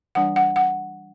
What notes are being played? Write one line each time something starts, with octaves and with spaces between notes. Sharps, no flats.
E3 G3 D4 F#5
F#5
F#5